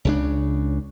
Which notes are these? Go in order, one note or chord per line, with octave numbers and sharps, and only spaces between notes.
C#2 C#3 D4